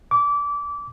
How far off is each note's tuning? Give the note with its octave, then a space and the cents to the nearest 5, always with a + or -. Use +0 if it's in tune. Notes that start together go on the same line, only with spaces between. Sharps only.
D6 -25